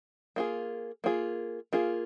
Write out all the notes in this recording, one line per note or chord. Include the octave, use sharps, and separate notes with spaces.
A#3 F4 G#4
A#3 F4 G#4
A#3 F4 G#4